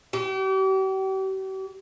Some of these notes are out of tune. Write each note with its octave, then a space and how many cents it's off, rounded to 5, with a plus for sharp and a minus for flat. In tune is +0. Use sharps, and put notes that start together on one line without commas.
G4 -40